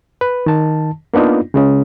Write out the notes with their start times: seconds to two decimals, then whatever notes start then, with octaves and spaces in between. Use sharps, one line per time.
0.21 B4
0.46 D#3 A5
1.14 A#3 B3 D4 D#4 F4
1.54 C#3 G#3 C#4